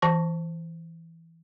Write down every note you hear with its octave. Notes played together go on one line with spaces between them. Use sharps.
E3 A5 C#6